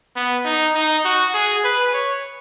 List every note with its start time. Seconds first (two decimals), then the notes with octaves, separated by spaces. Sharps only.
0.16 B3
0.45 D#4
0.75 D#4
1.05 F#4
1.35 G#4
1.64 B4
1.94 C#5